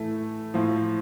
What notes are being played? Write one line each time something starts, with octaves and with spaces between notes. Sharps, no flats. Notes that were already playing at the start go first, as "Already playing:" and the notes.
Already playing: A2 E3 A3
A2 F3